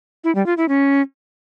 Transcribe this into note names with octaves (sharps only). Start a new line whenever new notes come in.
E4
G3
F4
E4
C#4